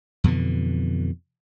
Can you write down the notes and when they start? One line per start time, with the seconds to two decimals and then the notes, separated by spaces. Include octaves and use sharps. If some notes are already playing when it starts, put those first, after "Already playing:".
0.24 F2 B2 D3 E3